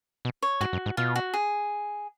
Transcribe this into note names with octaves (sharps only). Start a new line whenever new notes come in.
B2
C#5
G#2 F#4
F#2
G#2
B2 F4
F#4
G#4